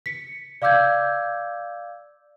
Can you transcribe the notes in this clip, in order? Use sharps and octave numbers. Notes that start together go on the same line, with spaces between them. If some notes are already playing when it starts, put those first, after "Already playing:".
B6 C#7
D5 F5 D6 E6 G6 G#6